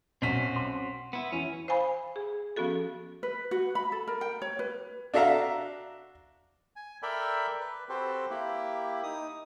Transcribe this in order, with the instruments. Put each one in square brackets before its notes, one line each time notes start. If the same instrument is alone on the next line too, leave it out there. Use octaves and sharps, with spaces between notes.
[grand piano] B1 B6 [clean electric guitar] C4 C#4 F#4
[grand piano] C6
[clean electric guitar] B3 E4
[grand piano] E3 [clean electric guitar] C#4
[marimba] C5 F5 G#5 B5
G#4
F3 B3 C#4 F#4 A4
[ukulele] B4
F#4
B5
A4
A#4
G5
C#5
B4
[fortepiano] D4 F#4 A4 E5 F5 A#5
[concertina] G#5
A4 A#4 D5 E5 G5 B5
B4
C4 F#4 G4 A4 B4 C5
A#3 E4 G4
D#4 D#6